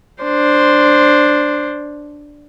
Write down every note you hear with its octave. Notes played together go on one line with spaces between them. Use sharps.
D4 C5